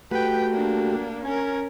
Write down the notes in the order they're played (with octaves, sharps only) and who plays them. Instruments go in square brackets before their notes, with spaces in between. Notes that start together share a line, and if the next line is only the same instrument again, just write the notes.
[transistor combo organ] A3 F#4 G4 [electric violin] B4 G5
[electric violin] A#3 D4
[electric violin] C#4 A#4 [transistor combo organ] G#5